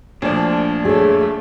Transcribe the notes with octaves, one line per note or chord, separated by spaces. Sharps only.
D2 A#2 F3 D4
A3 G#4 C#5